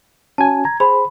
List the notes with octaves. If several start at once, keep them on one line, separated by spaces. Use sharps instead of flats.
C#4 F#4 G#5 A5
A#5 G#6
G#4 C5 B5